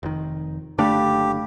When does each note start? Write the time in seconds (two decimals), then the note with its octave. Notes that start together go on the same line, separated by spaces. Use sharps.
0.03 F1 D#3
0.78 F#1 D3 A3 D4 G4 F5 B5